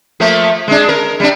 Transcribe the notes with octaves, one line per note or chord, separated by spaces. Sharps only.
F3 A3 A#3
G#3 D4
A#4
G3 D4